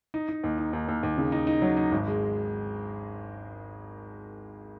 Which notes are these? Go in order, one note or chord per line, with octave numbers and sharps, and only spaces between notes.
D#4
D#4
D#2
D#4
D#2
D#2
D#2
C#3
D#4
D#4
F#3
D#4
G#1
G#3